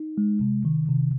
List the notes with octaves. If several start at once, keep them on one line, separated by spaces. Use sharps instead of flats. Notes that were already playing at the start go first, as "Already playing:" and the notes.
Already playing: D#4
G#3
C3
D#3
C3